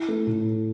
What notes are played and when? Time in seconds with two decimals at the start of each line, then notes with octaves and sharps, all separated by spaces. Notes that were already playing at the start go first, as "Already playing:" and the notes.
Already playing: E4
0.08 A3
0.27 A2